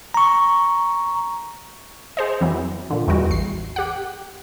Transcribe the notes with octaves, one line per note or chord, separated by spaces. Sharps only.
A#5 C#6
G#4 C5 D#5
F2 E3 F#3
A#2 D3
E2 G3 G#3 F#4
A1 C7
G4 F#5